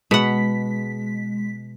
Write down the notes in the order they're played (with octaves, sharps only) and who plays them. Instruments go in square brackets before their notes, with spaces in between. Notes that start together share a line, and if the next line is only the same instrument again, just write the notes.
[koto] B2 F#5 [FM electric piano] G#3 B6